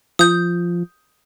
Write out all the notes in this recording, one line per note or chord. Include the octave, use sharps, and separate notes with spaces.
F3 D#6 G6